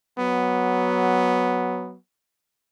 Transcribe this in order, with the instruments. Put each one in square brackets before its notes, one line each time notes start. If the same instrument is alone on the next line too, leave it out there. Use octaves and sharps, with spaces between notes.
[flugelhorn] F#3 [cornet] B3